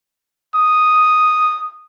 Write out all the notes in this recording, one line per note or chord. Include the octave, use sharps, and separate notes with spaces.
D#6